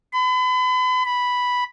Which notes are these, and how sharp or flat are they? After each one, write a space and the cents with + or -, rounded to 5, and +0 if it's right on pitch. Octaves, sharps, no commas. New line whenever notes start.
B5 +40
B5 +0